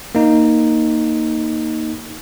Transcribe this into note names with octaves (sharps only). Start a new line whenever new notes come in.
A#3 D#4